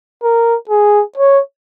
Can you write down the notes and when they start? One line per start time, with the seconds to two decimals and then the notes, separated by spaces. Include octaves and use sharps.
0.23 A#4
0.69 G#4
1.18 C#5